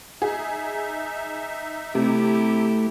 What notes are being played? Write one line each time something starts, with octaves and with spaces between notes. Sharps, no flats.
D#4 G#4 E5
C3 A3 E4 G4